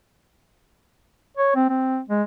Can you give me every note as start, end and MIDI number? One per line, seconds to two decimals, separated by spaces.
1.37 1.53 73
1.55 1.67 60
1.69 2.00 60
2.09 2.22 56